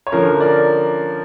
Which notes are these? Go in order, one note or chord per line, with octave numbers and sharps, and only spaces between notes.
C#5
D3 F3 C#4 A#4
A#4 D5